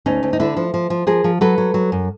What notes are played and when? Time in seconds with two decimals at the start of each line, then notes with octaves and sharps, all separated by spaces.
0.06 D2 C#4 D#4
0.23 D2
0.33 D#4
0.40 D3 D4 E4
0.57 F3
0.74 F3
0.90 F3
1.07 F3 G#4 A#4
1.24 F3
1.41 F#3 A4 B4
1.58 F#3
1.74 F#3
1.92 F#2